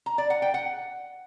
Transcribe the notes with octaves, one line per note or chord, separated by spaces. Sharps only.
A#5
D5
F#5
G5
F#5